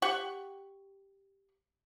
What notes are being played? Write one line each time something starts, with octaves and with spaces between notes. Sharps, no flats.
G4 F#5 C#6